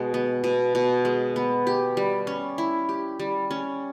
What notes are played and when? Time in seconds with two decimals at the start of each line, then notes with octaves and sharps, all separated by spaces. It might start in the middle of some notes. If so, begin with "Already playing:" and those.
Already playing: B2 G#3
0.14 B3
0.44 B2
0.75 B2
1.05 G#3
1.36 B3
1.67 G4
1.97 G3
2.27 C#4
2.58 E4
2.89 G4
3.20 G3
3.51 C#4